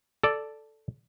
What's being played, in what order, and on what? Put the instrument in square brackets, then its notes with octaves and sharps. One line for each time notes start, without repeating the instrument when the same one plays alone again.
[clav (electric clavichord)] A4 D5